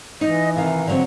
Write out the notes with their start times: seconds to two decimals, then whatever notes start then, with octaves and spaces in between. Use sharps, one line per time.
0.21 E3 D#4 D#5
0.56 C3 D#3 F5
0.87 D3 F#3 C4